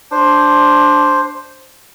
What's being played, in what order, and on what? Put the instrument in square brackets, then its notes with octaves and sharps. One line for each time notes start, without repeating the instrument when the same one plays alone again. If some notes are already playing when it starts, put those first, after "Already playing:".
[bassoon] D4 [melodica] C5